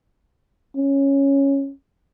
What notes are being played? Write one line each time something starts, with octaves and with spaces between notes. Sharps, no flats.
C#4